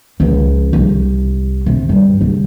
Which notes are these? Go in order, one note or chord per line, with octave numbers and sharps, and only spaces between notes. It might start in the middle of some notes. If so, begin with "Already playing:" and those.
C#2 F3
C2
C3
G2
C2